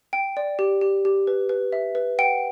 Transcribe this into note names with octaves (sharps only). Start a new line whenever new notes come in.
G5
D5
G4
G4
G4
B4
B4
E5
B4
F#5 G5